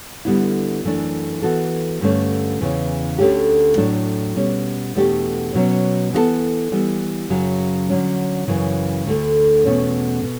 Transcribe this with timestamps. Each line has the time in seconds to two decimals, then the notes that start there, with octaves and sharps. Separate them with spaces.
0.25 D3 G3 B3 E4
0.84 F#2 E3 A3 D4
1.42 E3 B3 F#4 A4
2.01 G2 D3 A3 C#4
2.61 E2 C#3 E3
3.18 D2 D3 A3 C#4 G4
3.77 A2 F#3 A3 D4
4.36 B2 G3 C#4
4.95 E2 B2 A3 D4 G4
5.55 B2 F#3 C#4
6.13 E3 B3 F#4 A4
6.72 E3 G3 B3
7.30 F#2 C#3 F#3
7.89 D3 F#3 C#4
8.48 F#2 C#3 E3
9.06 D2 D3 A3
9.65 E2 B2 A3 C#4
10.24 B2